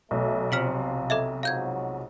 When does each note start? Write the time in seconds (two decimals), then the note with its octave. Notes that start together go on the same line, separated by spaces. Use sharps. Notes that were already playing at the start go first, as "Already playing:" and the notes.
0.11 B1 A3
0.52 C3 F3 F6 B6 F#7
1.10 A4 D#5 E5
1.43 G#2 F3 F#3 F5 G6 G#6